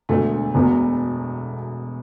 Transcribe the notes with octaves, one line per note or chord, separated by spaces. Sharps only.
E1 D2 D3 A3
E1 E2 B2